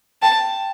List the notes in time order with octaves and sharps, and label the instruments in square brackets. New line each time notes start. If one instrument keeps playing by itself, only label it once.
[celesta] G5 [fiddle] A5